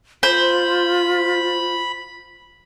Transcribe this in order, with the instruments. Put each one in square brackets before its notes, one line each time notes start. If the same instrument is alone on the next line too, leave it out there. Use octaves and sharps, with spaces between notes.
[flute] F4 [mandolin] C5 [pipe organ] B5